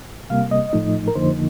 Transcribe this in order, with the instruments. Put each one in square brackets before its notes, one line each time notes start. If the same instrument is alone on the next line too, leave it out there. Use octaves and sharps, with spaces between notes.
[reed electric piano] C3 G3 A#3 F5
D#5
A2 F3 A3 D#4
A#4
F2 D3 F3 A#3 D#4 C5